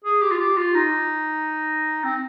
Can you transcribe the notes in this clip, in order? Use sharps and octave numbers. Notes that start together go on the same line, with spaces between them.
G#4
G4
F4
G4
F4
D#4
C4